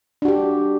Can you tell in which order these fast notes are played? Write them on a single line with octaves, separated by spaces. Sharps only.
D4 F#4 G4